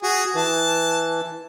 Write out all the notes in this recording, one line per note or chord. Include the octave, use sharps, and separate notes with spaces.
F#4 G#4
E3 A5